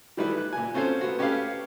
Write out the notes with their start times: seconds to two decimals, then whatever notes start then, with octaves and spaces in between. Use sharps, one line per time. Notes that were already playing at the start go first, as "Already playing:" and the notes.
0.17 D#3 E3 G3 A3 E4 B4
0.38 F#6
0.53 A#2 G#5
0.74 C4 C#4 F4 F#4 A4 C5
1.01 B3 F#4
1.19 C#4 G4 A4 B4 F5